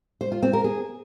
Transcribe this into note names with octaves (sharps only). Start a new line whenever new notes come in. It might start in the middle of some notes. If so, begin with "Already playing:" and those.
C5
F4
C4
A#4
G#4